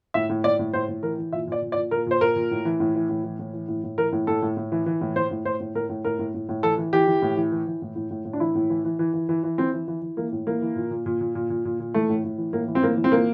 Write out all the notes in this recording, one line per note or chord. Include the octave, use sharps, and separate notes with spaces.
A2 E5
A2
A2 D5
A2
A2 C5
A2
E3 A#4
E3
A#2 E5
A#2 D5
A#2
D5
A#2
A#2 A#4
A#2 C5
A#2 A#4
A#2
A2
E3
A2
E3
A2
E3
A2
E3
A2
A2
E3 A#4
A2
A2 A4
A2
A2
E3
E3
A2
A2 C5
A2
A2 C5
A2
A2 A#4
A2
A2 A#4
A2
A2
A2
E3 A4
E3
E3 G4
E3
A2
E3
E3
E3
A2
A2
A2
A2
D4
E3 E4
A2
E3
E3
E3
E3
E3
E3
E3 C4
E3
E3
E3
E3 A#3
A2
E3 A#3
E3
A#2
A#2
A#2
A#2
A#2
A#2
A#2
A#2
E3 A3
A2
A2
E3
A2 A#3
E3
C4
A2 A#3
E3
C4
A#2 A#3